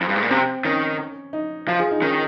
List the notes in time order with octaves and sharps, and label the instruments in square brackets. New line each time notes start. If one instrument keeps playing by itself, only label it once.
[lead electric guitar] F2
G2
G#2
A#2
[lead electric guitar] C3 [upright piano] C4
[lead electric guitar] D#3 [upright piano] C#4
[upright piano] D#4
[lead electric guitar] F3 [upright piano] F4
[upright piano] G#4
D#4
[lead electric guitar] D#3 [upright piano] C#4